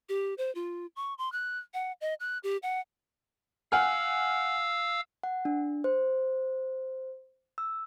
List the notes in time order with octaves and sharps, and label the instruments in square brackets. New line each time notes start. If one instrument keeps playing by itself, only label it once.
[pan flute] G4
C5
F4
C#6
C6
F#6
F#5
D#5
F#6
G4
F#5
[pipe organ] F5 E6 [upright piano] F#5 G#5 F6
[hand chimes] F#5
D4
C5
E6